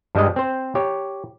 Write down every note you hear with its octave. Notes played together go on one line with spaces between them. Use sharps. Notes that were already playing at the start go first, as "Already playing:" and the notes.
G2 G3 G#3 D#5
C4 C5
G4 C#5